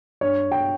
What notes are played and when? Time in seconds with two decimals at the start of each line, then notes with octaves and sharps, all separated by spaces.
0.21 G2 C#5
0.51 G5